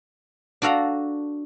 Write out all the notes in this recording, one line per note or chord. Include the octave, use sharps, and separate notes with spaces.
D4 F#4 A4 F5 A#5